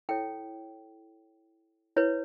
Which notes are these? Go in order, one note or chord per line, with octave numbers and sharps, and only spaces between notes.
E4 A4 C#5 G5
E4 B4 C#5